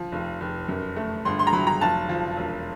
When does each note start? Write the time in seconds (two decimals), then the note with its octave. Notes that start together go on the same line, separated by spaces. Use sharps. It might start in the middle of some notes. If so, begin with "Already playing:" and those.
Already playing: F3
0.12 F1
0.41 F1
0.68 F#2
0.96 A3
1.25 G1 C6
1.39 C6
1.47 A#5
1.52 F#3 B5
1.67 A#5
1.81 F1 A5
2.09 F3
2.37 E1